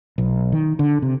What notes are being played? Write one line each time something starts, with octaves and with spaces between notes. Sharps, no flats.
B1
D#3
D3
C3